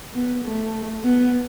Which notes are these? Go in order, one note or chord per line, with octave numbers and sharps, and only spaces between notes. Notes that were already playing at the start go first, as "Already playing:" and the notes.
B3
A3
B3